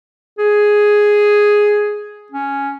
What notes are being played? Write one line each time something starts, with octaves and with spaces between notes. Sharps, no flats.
G#4
C#4